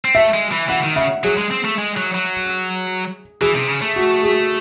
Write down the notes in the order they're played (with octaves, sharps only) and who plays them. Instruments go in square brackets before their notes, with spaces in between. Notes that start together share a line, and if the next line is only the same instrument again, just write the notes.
[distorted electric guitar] C4
[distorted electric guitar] A3 [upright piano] E5
[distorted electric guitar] G#3
E3
[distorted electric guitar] E3 [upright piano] F#5
[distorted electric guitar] D#3
[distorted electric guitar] C#3 [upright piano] E5
[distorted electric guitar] F#3 [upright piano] G#4
[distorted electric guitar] G#3
C4
A3
G#3
F#3
F#3
[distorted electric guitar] E3 [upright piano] G#4
[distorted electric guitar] C3
C#3
A3
[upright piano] F#4
G#4